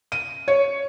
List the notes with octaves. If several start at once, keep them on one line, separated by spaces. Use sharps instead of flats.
D#7
C#5